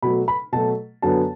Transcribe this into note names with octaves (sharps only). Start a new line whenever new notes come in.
B2 F#3 A3 B5
B5
B2 F#3 A3 A5
F#2 D3 F#3 B3 A5